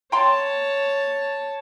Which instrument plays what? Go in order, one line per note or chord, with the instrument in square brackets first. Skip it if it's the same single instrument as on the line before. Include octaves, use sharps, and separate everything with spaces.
[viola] C#5 A5 [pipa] G5 A#5 C6